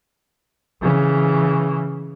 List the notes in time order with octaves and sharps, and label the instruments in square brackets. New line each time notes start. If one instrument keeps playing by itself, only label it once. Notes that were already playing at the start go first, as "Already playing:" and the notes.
[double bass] C#3 E3